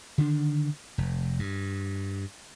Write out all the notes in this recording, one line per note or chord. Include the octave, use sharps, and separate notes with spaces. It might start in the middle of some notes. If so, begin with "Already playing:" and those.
D3 D#3 D4
F1
G2